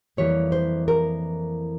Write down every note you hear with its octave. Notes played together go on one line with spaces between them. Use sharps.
F2 E3 G3 A#3 C#5
C5
A#4